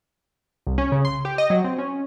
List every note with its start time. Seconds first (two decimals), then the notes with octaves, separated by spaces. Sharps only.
0.67 C2
0.78 C#4
0.92 C#3
1.05 C6
1.25 G4
1.38 D#5
1.50 F#3
1.64 C4
1.79 C#4